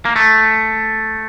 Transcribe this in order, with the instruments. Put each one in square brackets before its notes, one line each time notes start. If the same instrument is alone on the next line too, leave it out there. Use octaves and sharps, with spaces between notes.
[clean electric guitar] A#3
A3